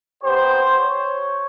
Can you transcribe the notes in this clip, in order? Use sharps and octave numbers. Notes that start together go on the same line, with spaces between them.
B3 D#4 G4 C5
C#5